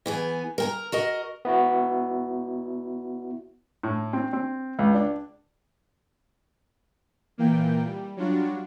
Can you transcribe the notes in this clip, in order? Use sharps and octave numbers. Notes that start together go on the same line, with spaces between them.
E3 B3 G#4
A#4 G5 A#5
F#4 A#4 D#5
B3 E4 F#4
A2
C4
C4
C#2
D4
A#2 E3 A#3 G5
G3
F#3 G3 D4 F4 F#4